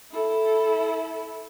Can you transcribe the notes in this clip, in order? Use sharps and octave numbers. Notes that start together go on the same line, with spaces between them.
E4 A4